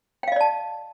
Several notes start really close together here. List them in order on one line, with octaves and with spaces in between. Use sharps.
G5 F5 D#5 D5 A5